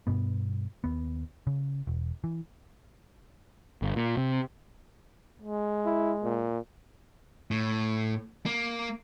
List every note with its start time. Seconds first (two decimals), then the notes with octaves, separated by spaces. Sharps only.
0.07 G2 B2 B3
0.84 D#2 B3
1.47 C#3
1.87 E1
2.24 E3
3.82 G1
3.96 A#2
4.17 C3
5.42 G#3
5.85 E4
6.23 A#2
7.51 A2
8.46 A#3